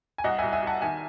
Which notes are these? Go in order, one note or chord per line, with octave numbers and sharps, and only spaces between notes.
G#5
C2 D#5 F#5
C2 E5 G#5
E5 G#5
C2 F#5 A5
D#3 E5 G#5